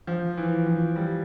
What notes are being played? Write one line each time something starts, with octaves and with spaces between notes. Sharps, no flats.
F3
E3
F3
G3